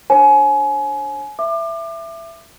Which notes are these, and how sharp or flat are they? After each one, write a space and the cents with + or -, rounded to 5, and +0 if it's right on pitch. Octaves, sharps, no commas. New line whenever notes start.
D4 +0 C5 +45 G#5 +30
E5 +10 D6 +30